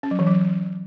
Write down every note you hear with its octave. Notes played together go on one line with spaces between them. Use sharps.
C#4
F#3
E3
F#3